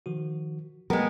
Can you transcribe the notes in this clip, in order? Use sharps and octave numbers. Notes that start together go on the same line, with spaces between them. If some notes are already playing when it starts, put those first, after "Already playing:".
D#3 F3 F#4
F#3 G#3 A3 B3 A#4 B4 G5 A#5